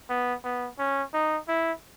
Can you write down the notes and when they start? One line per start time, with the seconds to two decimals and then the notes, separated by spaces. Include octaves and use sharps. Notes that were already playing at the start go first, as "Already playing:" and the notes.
0.09 B3
0.44 B3
0.79 C#4
1.14 D#4
1.48 E4